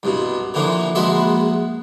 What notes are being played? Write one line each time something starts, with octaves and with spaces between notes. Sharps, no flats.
C2 G2 B2
A#2 D3 E3 F3
A#1 G#3 B3 F#4 E5 C6